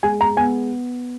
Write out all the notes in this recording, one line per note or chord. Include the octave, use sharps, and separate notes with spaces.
G#3 G#5
A#5
B3 G#5